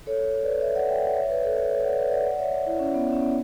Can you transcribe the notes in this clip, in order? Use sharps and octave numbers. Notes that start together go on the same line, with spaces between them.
A4 C#5
B4 D5
C#5 E5
D5 F#5
E5 G5
D5 F#5
C#5 E5
B4 D5
A4 C#5
A4 C#5
C#5 E5
D5 F#5
B4 D5
E5
D5 F#5
D5 F#5
C#5 E5
E4
C#4
B3
C#4
B3